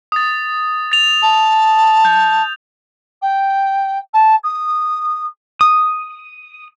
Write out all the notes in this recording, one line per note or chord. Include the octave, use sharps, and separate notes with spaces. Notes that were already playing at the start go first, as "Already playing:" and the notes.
D#6 A6
A6 F7
A5
G6
G5
A5
D#6
D#6